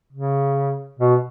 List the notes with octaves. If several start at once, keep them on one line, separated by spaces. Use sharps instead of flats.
C#3
B2